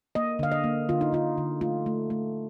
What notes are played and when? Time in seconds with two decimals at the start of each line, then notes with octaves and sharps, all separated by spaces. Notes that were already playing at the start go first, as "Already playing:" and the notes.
0.15 A#3 D#5
0.39 D3 F5
0.52 D#5
0.64 A#3
0.89 D3 F4
1.01 D#4
1.12 D3 F4
1.38 D3
1.61 A3 F4
1.86 A3
2.10 A3